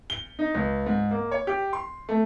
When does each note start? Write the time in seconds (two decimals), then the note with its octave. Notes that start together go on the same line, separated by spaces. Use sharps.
0.10 G7
0.39 D#4
0.55 C#2
0.86 G#2
1.11 A#3
1.31 C#5
1.47 G4
1.73 C6
2.09 A3